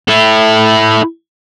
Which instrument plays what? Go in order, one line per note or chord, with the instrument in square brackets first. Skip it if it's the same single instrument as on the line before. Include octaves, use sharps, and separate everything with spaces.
[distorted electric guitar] E4 A4